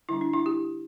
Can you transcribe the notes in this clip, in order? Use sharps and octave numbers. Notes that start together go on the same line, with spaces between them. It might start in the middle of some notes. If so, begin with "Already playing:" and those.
D3 G3 D4 E4
D4
E4
G4